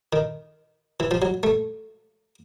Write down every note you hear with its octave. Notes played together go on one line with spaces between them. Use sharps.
D#3
E3
F3
F#3
A3